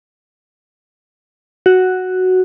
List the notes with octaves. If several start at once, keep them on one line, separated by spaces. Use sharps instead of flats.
F#4